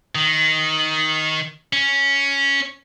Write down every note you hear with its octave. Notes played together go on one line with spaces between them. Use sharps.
D#3
C#4